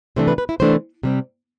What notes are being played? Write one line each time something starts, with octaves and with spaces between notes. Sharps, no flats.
C3 E3 A3 D4 C5
B4
B4
E4
C3 E3 A3 D4 C5
C3 G3 C4